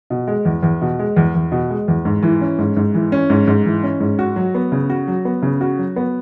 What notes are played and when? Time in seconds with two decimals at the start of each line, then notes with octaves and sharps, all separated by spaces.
0.10 B2
0.27 G#3
0.45 E2
0.63 E2
0.82 B2
0.99 G#3
1.16 E2
1.35 E2
1.52 B2
1.70 G#3
1.88 E2
2.05 G#2
2.23 E3
2.41 C#4
2.59 G#2
2.76 G#2
2.94 E3
3.12 C#4
3.30 G#2
3.47 G#2
3.66 E3
3.83 C#4
4.00 G#2
4.19 F#4
4.36 F#3
4.55 B3
4.72 C#3
4.90 F#4
5.08 F#3
5.25 B3
5.42 C#3
5.61 F#4
5.79 F#3
5.96 B3